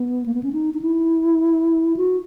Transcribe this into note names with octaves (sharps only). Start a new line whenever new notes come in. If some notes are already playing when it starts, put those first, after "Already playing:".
Already playing: B3
A#3
B3
C#4
D#4
D#4
E4
F#4